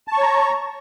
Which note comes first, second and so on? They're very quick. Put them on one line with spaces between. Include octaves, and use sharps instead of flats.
A5 C#6 C#5 A#5